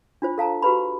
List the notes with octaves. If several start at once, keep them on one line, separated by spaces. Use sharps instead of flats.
D4 F4 C5
A4 F5 A5 A#5
F#4 G4 B4 B5